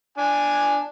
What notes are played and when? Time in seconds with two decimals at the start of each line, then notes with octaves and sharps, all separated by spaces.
0.18 D4 G#5